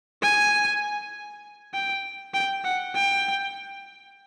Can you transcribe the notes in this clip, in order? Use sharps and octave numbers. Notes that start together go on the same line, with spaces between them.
G#5
G5
G5
F#5
G5